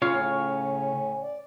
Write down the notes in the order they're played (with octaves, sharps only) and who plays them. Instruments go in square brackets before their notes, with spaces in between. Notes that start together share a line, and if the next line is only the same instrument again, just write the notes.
[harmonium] A2 C#4 [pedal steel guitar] C#3 C#5 F5 [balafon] F4
[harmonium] D5